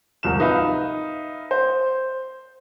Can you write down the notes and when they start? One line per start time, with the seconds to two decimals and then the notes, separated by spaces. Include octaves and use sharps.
0.23 D1 C2 F3 A#4 E7
0.40 D#4 B4 E5 F5
1.51 C5